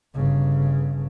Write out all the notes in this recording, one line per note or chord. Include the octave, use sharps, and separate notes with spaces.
G1 C#3